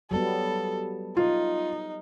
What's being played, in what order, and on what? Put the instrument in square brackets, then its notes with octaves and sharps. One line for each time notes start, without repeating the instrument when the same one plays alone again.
[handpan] F#3 G3 B3 [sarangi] A4
[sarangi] D#4 [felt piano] F4